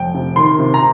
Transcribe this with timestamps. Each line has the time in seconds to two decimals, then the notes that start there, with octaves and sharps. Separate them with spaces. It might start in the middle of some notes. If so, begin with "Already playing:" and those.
Already playing: F1 G5
0.14 C3
0.36 D#3 C6
0.59 C3
0.74 A#5